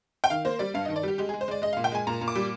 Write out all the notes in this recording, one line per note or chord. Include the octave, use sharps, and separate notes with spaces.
G5
D#3 F5
A#3 C5
G3 D5
G2 F5
D#5
D#3
D5
G3 G4
G#3 G4
G#4
G#3
C5
G#3 D5
G#3 D#5
F5
A#2
G5
G#3 G#5
A#2 A#5
A#2
D6
G3